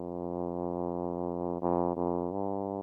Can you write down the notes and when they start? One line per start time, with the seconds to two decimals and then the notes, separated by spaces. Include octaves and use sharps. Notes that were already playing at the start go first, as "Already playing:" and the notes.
Already playing: F2
1.61 F2
1.96 F2
2.32 G2